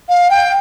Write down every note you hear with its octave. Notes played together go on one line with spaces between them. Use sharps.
F5
G5